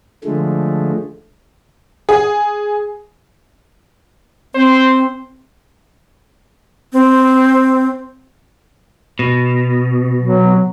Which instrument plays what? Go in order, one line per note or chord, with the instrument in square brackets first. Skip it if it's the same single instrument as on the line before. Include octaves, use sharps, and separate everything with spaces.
[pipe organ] D3 F3 G#3 A3
[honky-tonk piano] G#4
[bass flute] C4 [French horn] C5
[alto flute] C4
[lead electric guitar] B2
[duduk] F#3